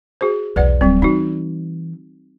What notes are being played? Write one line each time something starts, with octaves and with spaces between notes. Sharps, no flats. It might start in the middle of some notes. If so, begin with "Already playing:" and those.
F#4 G#4 C5
B1 E2 B4 D5 F#5
D1 F#3 G3 C4
E3 D#4 F#4